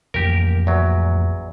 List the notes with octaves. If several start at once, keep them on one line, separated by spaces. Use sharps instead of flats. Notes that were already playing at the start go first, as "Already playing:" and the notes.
A1 F2 A#3 G4 A#4
E2 F#3